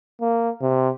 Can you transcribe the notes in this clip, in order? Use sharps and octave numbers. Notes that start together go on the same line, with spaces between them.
A#3
C3